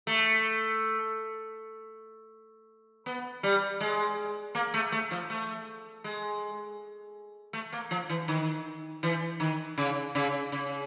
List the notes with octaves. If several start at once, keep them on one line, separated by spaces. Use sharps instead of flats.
A3
B3
G3
G#3
A#3
A3
A3
F3
A3
G#3
A3
A#3
F3
E3
D#3
E3
D#3
C#3
C#3
C#3